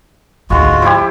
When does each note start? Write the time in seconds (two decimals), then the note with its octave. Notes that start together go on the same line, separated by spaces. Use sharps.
0.50 D2 G#2 G#3 F4 F#4
0.82 F3 E4 G4